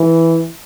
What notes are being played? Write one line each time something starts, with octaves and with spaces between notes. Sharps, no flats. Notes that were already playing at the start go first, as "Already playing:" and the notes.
Already playing: E3